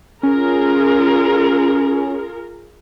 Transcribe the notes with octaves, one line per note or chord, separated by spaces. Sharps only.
C#4 F4 G#4 A#4